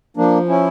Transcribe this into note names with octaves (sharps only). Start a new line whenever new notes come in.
F3 A#3 D4
C#4 E4